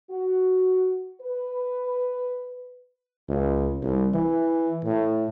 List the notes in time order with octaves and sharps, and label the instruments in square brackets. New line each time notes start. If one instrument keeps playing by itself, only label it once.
[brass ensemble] F#4
B4
[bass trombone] C#2
C2
E3
A2